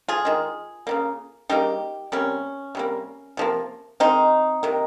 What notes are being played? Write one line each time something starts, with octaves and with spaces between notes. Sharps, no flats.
F4 G#4
D#3 G#3
C#3 G3 A#3
C#3 G3 A#3 D#4 G4
C3 G3 A#3 C#4
C3 G3 A#3
C3 F3 A#3
D#3 G#3 C4 D#4
C3 D#3 A#3